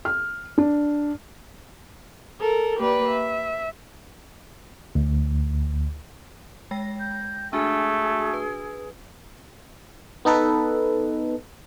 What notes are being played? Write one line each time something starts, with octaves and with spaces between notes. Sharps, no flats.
F6
D4
A4 A#4
A#3 G4 B4 D5
E5
D2
G#3 G5 A#6
G6
A3 D4 F#4 G#4 G#5
B4
B3 D#4 A4 B4